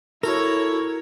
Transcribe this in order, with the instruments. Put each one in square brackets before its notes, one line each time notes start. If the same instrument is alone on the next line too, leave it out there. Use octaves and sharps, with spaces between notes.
[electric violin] E4 C#5 [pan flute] F#4 [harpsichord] A4 [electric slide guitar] A#4